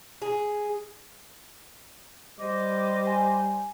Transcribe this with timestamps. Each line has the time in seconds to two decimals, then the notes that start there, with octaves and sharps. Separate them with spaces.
0.22 G#4
2.40 G3 C5 D#5 D6
3.07 G#5